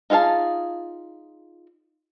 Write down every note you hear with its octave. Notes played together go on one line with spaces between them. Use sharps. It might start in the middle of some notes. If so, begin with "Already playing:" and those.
D#4 F4 G#4 F5 A5